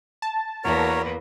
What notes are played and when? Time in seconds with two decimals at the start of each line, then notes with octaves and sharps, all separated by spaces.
0.22 A5
0.64 E2 A#3 B3 F#4 A#4 C#5